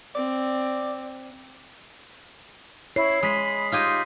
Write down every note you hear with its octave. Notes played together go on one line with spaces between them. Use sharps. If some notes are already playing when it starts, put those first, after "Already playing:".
C4 D5
E4 C#5 C7
G#3 B5 D#6 B6
D#4 F4 G4 G#5